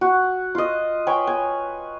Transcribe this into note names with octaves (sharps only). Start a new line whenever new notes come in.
F#4
F4 D#5
B4 C#5 G5 G#5
G#5